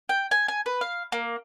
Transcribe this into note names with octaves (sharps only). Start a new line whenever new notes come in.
G5
G#5
G#5
B4
F5
A#3